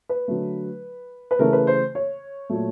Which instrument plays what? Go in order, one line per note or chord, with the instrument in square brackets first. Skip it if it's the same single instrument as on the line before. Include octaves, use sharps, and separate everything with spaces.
[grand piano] B4
D3 F#3 A3
B4
C#3 E3 A3 A#4
B4
C5
C#5
A#2 F#3 A3